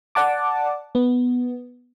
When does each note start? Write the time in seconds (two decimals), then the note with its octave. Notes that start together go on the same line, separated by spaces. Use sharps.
0.15 D5 F#5 A5 D6
0.95 B3